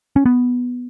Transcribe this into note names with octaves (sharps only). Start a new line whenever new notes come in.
C#4
B3